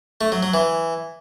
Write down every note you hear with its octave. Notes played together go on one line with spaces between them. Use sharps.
A3
F#3
F#3
E3